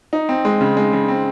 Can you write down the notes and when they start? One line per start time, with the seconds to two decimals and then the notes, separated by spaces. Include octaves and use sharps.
0.13 D#4
0.29 C4
0.45 G#3
0.61 C#3
0.77 G#3
0.93 C#3
1.08 C4